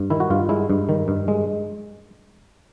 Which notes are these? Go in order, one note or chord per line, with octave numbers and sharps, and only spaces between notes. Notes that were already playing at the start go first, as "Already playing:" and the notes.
Already playing: G2
D#3 E4
F#4
G2 F4
G#3 E4
G2
D#3
G2
G#3